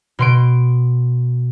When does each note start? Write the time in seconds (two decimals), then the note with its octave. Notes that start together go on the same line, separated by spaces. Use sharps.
0.19 B2 C6 D7